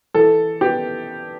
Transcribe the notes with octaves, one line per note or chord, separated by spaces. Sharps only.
E3 A4
B3 G4